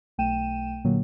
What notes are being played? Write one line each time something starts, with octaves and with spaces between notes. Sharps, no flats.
B1 A3 G5 D#7 E7
A#2 D3 F#3 A#3